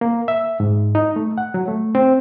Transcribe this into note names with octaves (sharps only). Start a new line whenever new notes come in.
A#3
E5
G#2
D#4
A3
F#5
F#3
A3
C4